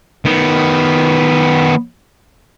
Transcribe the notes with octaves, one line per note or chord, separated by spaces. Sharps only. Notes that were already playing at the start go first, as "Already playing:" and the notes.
D#3 B3